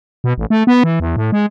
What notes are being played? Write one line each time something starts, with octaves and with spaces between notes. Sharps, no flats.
B2
A1
A3
B3
E3
E2
A2
G#3